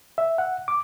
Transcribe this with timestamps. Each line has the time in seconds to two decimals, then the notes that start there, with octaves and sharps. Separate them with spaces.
0.18 E5
0.38 F#5
0.68 D6